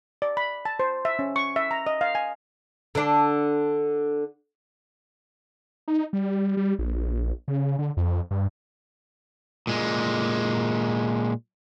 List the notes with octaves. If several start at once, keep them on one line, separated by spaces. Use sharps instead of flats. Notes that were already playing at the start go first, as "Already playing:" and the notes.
D5
B5
A5
C5
E5
C#4
C#6
E5
A#5
D#5
F5
G#5
D3 D4
D#4
G3
G3
A#1
C#3
D3
F2
G2
A#2 G#3